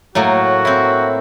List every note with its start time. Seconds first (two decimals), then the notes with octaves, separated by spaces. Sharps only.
0.15 A2 F#3 A#3 F#4
0.65 C4 E4